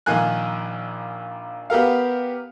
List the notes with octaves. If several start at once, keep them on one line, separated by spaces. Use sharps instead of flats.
A#1 D#3 A#3 G#5 F#6
B3 G4 A#4 F5